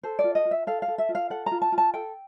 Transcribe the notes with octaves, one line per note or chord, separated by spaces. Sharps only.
A4 C5
D5
F4
D#5
F4
E5
A4 F5
F5
A4
E5
F4
F5
A4 F#5
A#5
F4
A5
F4
A5
A4 G5